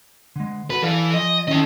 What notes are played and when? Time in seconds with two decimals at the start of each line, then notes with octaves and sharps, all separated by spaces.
0.36 D3 G#3
0.70 F#4 A4 B4
0.82 E3 A4 D5 F5
1.14 F3 D#5 G#5
1.48 D#3 C#4 E4 A4 D#5